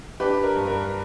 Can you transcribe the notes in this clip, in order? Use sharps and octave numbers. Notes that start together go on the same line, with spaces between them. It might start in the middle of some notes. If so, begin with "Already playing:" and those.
D4 G4 B4
A#4
G2
A#4